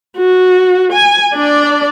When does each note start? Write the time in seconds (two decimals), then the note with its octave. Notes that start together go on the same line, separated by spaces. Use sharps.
0.17 F#4
0.92 G#5
1.34 D4 D5